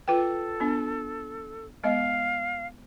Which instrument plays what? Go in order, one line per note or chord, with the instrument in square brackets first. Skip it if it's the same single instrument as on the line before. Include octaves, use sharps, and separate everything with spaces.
[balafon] F4 B4 G5 [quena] A4
[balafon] B3 D4
[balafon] G#3 B3 D#5 [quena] F5